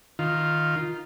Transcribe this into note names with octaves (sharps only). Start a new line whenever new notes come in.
D#3 F4